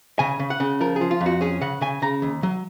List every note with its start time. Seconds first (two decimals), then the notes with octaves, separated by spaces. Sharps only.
0.19 C#3 G#5
0.40 C#3
0.50 F#5
0.60 C#3
0.81 F3 A#4
0.96 G#4
1.01 F3
1.11 F4
1.21 F2
1.26 F#4
1.41 C#4 G#4
1.61 C#3 F#5
1.81 C#3 G#5
2.02 C#3 A#5
2.22 D#2
2.43 F#3